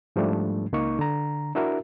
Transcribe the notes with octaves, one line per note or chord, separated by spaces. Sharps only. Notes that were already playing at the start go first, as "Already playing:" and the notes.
G#2 F3 G3 A3 D4
C#2 A#3 D#4 C#6
D3 A#5
D4 E4 F#4 A#4 E5